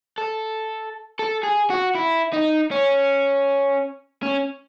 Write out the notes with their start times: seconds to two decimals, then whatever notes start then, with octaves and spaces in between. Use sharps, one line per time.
0.18 A4
1.19 A4
1.44 G#4
1.70 F#4
1.95 E4
2.33 D#4
2.71 C#4
4.23 C#4